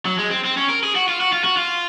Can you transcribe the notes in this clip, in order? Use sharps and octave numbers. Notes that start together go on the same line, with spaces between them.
F#3
G#3
C4
C4
C#4
A#4
G#4
F#4
F4
F#4
F4
F#4
F4